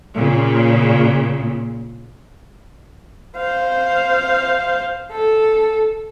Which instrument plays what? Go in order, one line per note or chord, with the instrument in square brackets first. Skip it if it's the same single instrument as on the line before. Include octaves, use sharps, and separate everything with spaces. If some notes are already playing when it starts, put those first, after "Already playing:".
[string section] A#2 C#3
[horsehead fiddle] C5 F5
A4